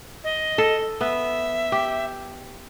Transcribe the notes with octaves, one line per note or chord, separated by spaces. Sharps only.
D#5
A4
B3 E5
G4